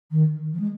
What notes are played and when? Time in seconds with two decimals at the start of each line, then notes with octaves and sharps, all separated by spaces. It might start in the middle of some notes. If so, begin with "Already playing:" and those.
0.11 D#3
0.53 F3
0.59 G#3